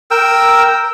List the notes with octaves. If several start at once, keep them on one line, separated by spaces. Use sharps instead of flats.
A#4 G5 E6